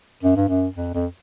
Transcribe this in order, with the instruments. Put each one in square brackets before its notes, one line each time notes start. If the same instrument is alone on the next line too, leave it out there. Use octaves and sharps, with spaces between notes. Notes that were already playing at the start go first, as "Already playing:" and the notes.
[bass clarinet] F#2
G2
F#2
F2
F2